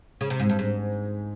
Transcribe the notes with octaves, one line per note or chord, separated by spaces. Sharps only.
C#3
C3
G#2
G2
G#2